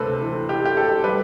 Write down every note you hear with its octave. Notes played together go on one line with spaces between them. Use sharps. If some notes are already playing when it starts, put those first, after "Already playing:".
Already playing: D2 C3 A4 B4 C5
E3
G4
A3 G4
A4
G3 B4